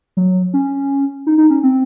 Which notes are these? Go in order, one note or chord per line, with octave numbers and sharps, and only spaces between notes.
F#3
C#4
D#4
D#4
C#4
C4